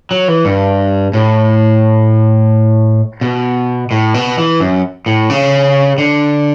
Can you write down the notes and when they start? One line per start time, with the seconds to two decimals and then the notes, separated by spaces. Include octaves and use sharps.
0.11 F#3
0.28 E3
0.45 G2
1.13 A2
3.21 B2
3.91 A2
4.14 B2
4.38 E3
4.60 F#2
5.06 A2
5.30 C#3
5.98 D3